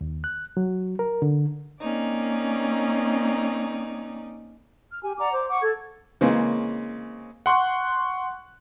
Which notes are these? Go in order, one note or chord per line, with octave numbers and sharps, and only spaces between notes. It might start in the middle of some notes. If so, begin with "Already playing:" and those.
D#2
F#6
F#3
A#4
D3
A#3 C4 C#4 D#4 D5
F6
G4 G#5
D5 F#5 A#5 D6
C5 D6
F#5 C#6 D6
A4 G#6
C#3 E3 G#3 A#3 C4 C#4
F#5 C6 C#6 F#6